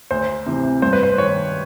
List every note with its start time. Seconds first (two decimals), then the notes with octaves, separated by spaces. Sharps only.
0.11 D2 C5
0.46 C3 E3
0.82 G2 C5
0.93 B4
1.03 C5
1.18 D#3 C#5